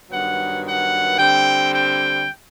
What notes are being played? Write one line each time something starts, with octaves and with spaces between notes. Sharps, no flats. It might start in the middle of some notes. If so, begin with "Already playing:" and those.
G2 D#3 F#3 B3 F#5
F#5
D3 G3 C4 G5
G5